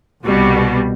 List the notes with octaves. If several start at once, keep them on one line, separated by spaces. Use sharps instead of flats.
C2 B2 G3